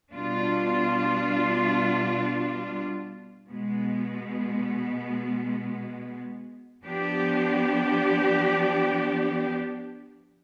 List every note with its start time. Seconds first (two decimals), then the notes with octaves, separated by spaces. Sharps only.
0.13 B2 G3 D4 F4
3.48 B2 G#3 B3
6.84 F3 B3 D4 G4